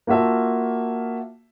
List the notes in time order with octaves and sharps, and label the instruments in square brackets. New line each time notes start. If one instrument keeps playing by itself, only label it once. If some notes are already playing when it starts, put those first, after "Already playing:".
[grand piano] A#3 F4 F#4 E5 A5